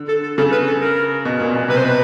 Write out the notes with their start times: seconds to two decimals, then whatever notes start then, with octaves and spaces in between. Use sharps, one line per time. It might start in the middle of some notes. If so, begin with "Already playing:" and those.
Already playing: D3
0.09 A4
0.23 A4
0.38 C#3 A4
0.52 B4
0.67 A4
0.81 A#4
1.25 B2
1.40 A#2
1.55 B2
1.68 C3 B4
1.77 C5
1.83 B2 B4